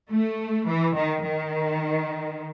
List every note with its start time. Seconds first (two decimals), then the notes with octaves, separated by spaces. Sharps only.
0.11 A3
0.67 E3
0.96 D#3
1.24 D#3